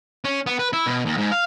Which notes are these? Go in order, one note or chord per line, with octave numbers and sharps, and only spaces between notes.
C#4
B3
B4
E4
B2
D#2
G#2
F5